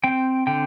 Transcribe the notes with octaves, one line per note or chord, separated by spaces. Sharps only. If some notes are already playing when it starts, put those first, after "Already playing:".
C4 G5
D3 G5